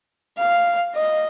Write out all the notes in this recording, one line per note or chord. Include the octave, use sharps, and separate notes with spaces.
F5
D#5